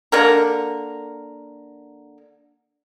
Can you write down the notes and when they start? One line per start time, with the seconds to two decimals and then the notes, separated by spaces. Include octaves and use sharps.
0.12 D3 A#3 A#4